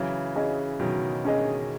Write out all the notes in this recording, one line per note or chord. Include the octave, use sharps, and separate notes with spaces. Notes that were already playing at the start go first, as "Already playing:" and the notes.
Already playing: C#3 E3 F#3
C#4 G#4 D#5
B2 D#3 F#3
C#4 G#4 D#5